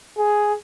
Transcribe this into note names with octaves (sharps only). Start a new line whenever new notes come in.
G#4